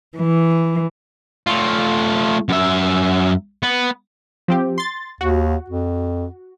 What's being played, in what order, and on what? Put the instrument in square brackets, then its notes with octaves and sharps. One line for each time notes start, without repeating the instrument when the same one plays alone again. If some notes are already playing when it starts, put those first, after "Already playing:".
[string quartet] E3
[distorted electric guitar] A3 F4
F#2 E5
B3
[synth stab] F3 C4 G4
C6 A6
[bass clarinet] D#2 [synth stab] F#4
[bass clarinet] F2